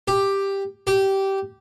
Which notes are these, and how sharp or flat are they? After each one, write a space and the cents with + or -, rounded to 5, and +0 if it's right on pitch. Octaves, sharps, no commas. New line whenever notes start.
G4 +5
G4 -15